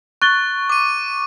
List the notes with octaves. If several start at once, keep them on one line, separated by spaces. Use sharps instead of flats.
C#6 F#6 A6 G7
D6 D#7